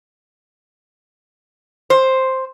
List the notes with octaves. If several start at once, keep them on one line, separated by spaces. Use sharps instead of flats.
C5